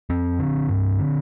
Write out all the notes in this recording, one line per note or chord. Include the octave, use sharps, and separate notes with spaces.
F2 C4
D3
G2
D3